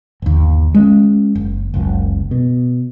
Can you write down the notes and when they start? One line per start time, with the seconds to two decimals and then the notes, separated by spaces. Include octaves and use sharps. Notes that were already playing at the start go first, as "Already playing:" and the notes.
0.22 G1 D#2
0.74 G#3 C#4
1.35 F#1
1.74 F#1 C#2 F#2
2.31 B2